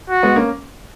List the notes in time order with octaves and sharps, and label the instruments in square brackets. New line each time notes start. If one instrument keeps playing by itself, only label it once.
[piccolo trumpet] F#4
[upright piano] G#3 B3
A#3 C#4